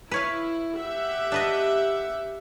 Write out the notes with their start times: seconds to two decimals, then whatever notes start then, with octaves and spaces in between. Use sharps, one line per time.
0.11 E4 B4 C#5 F5
0.76 G4 E5 F#5
1.32 D4 B4 D#5